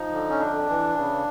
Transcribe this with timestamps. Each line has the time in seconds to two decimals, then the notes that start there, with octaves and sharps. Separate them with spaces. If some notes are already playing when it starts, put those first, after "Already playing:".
Already playing: F3 D#4
0.13 D3
0.30 C#4
0.40 F2 D4
0.69 E3
0.97 C#3